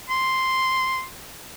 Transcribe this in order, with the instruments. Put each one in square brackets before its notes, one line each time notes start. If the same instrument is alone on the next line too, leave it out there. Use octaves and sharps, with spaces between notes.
[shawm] C6